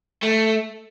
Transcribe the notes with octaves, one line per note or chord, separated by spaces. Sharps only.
A3